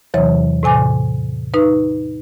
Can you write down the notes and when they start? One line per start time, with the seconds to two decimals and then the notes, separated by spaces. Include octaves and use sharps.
0.14 E2 C3 E3 F#3 C#5
0.63 A2 C3 G#5 D6
1.54 D#4 B4